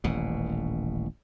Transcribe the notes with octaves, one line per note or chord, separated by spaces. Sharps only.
D#1 A1 B2